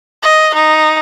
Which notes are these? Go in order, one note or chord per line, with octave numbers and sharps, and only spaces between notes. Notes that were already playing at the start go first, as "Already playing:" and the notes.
D#5
D#4